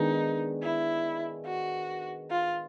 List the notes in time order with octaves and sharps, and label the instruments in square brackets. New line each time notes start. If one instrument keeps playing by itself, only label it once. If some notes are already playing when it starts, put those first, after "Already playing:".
Already playing: [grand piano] D#3 G#3 B3 D4 [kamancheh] D#4
[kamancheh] E4
F#4
F4